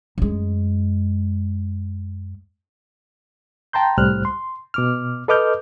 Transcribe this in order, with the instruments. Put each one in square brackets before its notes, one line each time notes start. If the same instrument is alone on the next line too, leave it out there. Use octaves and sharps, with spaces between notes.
[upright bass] F#2 G#3
[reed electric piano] G5 A5 A#5 C6 G6
C2 A2 G3 C5 F6 F#6
C6
B2 D6 F6
A4 B4 D#5 D6 F6 G6